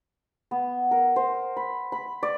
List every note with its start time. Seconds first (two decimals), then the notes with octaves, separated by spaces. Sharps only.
0.51 B3
0.91 A#4
1.16 C5
1.57 B5
1.92 B5
2.23 D5